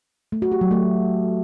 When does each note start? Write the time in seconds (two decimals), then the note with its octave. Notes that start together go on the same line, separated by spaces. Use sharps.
0.32 A3
0.42 F#4
0.52 G4
0.61 F#3
0.71 A3